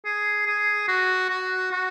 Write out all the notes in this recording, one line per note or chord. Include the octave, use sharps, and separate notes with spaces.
G#4
G#4
F#4
F#4
F#4